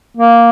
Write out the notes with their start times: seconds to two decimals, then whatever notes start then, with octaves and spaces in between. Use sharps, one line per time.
0.17 A#3